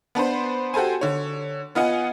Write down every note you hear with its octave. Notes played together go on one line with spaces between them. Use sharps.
B3 D4 B4 C5
F#4 G4 A4 C5 G#5
D3 C#5
B3 F4 D#5 F#5 G#5